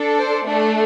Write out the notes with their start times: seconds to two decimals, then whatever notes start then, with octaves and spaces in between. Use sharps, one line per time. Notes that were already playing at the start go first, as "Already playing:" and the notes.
Already playing: D4 A4
0.19 C5
0.46 A3 D4 A4